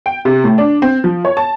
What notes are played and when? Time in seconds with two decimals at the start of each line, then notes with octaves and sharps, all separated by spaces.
0.06 G5
0.25 C3
0.44 A2
0.58 D4
0.82 C4
1.04 F3
1.25 C#5
1.37 A5